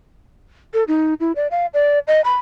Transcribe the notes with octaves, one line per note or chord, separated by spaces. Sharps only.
A4
D#4
E4
D5
F5
D5
D#5
B5